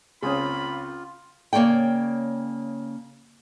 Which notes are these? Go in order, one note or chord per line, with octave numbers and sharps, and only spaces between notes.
C#2 A#3 C4 C#4 F4 G#4 B5
C#3 A#3 C#5 D5 G5